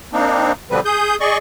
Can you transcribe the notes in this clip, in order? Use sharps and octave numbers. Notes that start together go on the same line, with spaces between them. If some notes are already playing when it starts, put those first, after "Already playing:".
A#3 C4 D4 D#4
B2 D3 F3 G3 C4 B4
G#4 D#6 G6
G#4 D5 D#5 C#6